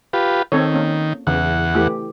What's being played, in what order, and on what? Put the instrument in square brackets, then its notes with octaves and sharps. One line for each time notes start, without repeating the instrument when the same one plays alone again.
[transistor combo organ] F4 G4 B4
[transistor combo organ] D#3 [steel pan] C4 A4 C#5
[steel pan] A#3 C#4
[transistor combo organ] E2 F#5 [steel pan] C#3 E3
[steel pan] E3 A3 G4